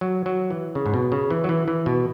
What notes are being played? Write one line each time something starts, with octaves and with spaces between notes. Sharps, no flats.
F#3
F#3
E3
C#3
G#2
B2
C#3
E3
F#3
E3
E3
B2